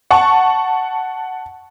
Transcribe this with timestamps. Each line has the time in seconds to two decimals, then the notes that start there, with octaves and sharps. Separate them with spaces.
0.11 F#5 A5 C#6